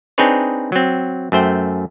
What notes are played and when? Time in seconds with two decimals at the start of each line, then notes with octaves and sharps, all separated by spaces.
0.18 C4 D4 D#4 G#4 B4 C#5
0.72 F#3 C4
1.32 F#2 A3 C5 G5